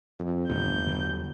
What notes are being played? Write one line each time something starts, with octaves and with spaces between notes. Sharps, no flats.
F2
G1 E2 A#2 D#3 A3 G6
D3 F#3 G3